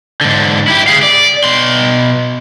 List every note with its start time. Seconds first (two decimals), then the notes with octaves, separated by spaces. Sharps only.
0.21 G#2 D3
0.68 E4 G4
0.88 G#4 F5
1.03 D5
1.44 B2 C6